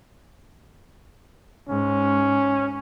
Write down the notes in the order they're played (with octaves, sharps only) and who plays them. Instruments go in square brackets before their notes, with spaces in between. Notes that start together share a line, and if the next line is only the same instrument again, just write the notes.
[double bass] G#2 [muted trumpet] C#4